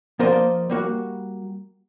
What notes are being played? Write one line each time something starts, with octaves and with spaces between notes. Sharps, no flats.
F3 A#3 A#4 C5 D5 D#5
G3 A#3 F#4